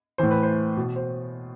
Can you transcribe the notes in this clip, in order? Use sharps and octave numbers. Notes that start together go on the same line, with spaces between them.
A2 E3 C5
B4
C5
B2
C5